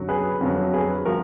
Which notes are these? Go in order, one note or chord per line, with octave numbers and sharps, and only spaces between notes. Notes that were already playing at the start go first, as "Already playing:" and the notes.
Already playing: F#2 D3 F#3
G#4 B4
F2 D3 F#3
G#4 B4
F3 F#4 A#4